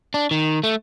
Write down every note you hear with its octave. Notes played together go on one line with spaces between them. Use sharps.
D4
D#3
A3